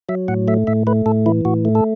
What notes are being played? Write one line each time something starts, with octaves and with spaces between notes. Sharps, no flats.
F#3 E5
A2 F#5
A3 E5
A2 E5
A3 B4
A2 A4
E3 E4
A2 F#4
A3
A4